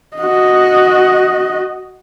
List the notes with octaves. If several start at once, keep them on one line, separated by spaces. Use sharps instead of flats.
F#4 D#5